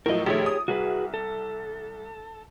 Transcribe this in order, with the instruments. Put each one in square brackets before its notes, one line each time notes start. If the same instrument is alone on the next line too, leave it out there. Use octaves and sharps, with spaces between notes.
[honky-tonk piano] A2 F3 F#3 [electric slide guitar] A#4 D#5
[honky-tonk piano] A#1 D#3 A3 [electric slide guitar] G4 G#4 C#5
[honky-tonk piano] D#6
[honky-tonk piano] C2 [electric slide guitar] F#4 G#4 B4
[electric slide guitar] A4